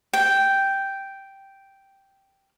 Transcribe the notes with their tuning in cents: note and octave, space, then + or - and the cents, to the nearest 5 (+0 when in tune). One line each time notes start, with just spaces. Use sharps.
G5 -5